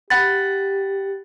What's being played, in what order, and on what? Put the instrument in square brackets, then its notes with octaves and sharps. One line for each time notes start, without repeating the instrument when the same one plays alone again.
[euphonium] G4 [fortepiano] F#5 B5 [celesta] A6